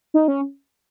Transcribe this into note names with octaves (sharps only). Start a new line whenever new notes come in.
D#4
C#4